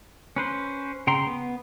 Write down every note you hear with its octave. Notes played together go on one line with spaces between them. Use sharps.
C#4 B4 C5
C#3 G5 A#5 C6
B3